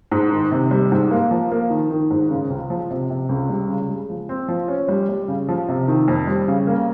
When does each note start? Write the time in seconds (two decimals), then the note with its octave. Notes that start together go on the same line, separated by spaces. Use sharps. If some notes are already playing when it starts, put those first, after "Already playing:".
0.12 G#2
0.32 D#3
0.51 C3
0.71 G3
0.92 G#2
1.11 A#3
1.31 F3
1.51 A#3
1.70 D#3
1.90 D#3
2.10 G#2
2.31 C#3
2.50 C#2
2.70 F3
2.91 C3
3.10 C3
3.29 C#2
3.49 G3
3.69 C#3
3.89 G#3
4.10 F3
4.29 C4
4.48 F3
4.68 C#4
4.88 G3
5.09 G3
5.28 C#3
5.48 F3
5.69 C3
5.88 D#3
6.08 F2
6.27 G3
6.48 C#3
6.67 A#3